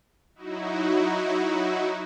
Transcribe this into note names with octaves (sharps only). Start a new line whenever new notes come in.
F#3 D#4 E4 F#4